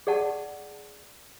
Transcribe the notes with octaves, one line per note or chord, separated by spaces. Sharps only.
G#4 D5 F#5 A5